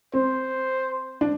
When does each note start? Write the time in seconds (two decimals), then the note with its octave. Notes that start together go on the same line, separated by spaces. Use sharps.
0.14 C4 C5
1.21 D4